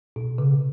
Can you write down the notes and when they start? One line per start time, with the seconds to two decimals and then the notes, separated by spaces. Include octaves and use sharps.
0.16 B2
0.38 C#3